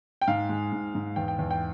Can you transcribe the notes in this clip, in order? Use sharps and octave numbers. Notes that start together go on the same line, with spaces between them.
G5
G#2 F5
G#3
G#2
G#2
E2 G5
G5
E2
G5